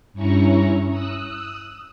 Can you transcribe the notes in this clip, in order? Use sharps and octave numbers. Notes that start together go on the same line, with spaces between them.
G2 C#4 E4 A#5 C#6
D#6 E6 F#6